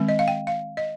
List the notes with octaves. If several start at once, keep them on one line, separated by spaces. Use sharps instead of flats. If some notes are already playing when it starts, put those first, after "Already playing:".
Already playing: D#3 G#3 C4
D#5
F5
G5
F5
D#5